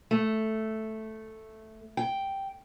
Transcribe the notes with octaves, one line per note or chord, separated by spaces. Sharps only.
A3
G5